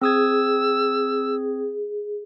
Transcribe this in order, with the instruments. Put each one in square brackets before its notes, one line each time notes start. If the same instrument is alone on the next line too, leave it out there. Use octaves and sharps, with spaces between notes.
[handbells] C4 D#6 G#6 [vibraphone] G#4 [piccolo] E6